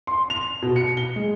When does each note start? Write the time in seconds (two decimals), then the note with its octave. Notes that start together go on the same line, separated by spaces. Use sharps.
0.07 C6
0.30 F7
0.62 B2
0.76 C#7
0.97 G7
1.16 G#3